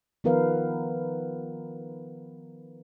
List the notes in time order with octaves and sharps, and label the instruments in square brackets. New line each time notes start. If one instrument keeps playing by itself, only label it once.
[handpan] D#3 F3 B3 A#4 B4 F5